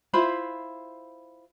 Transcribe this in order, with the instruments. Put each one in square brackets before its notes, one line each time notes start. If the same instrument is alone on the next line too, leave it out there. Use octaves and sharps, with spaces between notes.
[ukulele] E4 F4 C5 B5